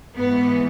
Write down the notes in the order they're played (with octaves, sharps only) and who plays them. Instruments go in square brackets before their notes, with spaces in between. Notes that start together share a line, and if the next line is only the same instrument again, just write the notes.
[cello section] G#2 E3 B3